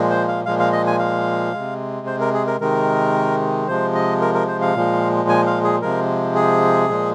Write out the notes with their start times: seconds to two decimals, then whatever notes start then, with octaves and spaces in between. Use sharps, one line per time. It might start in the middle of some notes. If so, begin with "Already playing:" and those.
Already playing: A#2 F3 G#3
0.10 C5
0.28 F5
0.46 A#2 F3 G#3 F5
0.60 F5
0.72 D#5
0.87 G#5
0.99 F5
1.53 C3 G#3
2.07 C5
2.20 A#4
2.34 G#4
2.47 A#4
2.60 C3 D#3 G#3 A#4
3.67 C3 F3 G#3 C5
3.95 D#5
4.21 A#4
4.34 A#4
4.48 C5
4.61 F5
4.74 A#2 F3 G#3
5.29 G#5
5.47 F5
5.63 G#4
5.81 C3 F3 G#3 A#4
6.35 G#4
6.89 A#2 F3 G#3